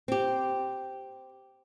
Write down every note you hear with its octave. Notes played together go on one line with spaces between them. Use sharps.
C4 G4